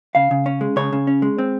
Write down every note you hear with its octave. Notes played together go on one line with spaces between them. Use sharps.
C#3 F5
C#3
C#4
G#3
C#3 C#5
C#3
C#4
G#3
C4